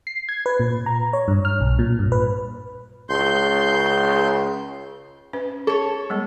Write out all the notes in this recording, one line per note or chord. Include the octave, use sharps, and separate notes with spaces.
C7
G#6
B4
A#2
A#5
C#5
G2
F6
B1
A#2
G2
B4
C#2 C6 G6
C#4 B4
G#4 A4 C#5
G3 G#3 B3